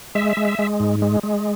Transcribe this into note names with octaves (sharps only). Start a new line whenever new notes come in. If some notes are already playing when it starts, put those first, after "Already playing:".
G#3 E5
G#3
G#3
G#2
G#3
G#3